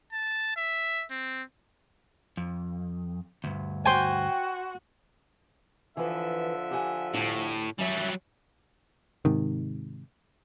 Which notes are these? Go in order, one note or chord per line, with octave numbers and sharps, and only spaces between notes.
A5
E5
C4
F2
D2 G2
F#4 C5 G5 G#5
D3 E3 F3 B4 E5
G4 F#5 G#5
D2 A2 D4
F#2 F#3 G3 E5
G#2 C3 D#3